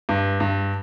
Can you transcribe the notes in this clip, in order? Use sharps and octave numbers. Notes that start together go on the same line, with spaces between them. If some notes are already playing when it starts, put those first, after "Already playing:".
G2
G2